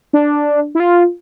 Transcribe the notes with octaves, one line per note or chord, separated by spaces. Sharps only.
D4
E4
F4